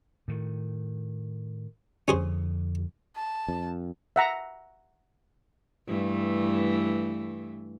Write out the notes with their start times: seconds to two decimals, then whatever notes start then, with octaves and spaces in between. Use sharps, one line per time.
0.28 A2 D#3
2.08 F2 D3 C#4 G#4 C5
3.16 A5
3.48 F2
4.16 E5 F#5 A#5
5.87 G2 E3 A3